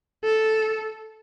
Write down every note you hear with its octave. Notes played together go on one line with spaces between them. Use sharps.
A4